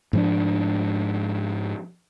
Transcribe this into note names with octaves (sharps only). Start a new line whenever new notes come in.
G#2 F3 D4